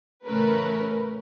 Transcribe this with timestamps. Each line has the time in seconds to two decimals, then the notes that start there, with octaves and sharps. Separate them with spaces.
0.24 A1 C#3 A3 C#4 A#4 B4